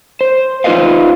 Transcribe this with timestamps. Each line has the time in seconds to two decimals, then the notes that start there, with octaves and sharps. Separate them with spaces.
0.21 C5
0.64 D#4 F4 G#4 B4 D#5 F5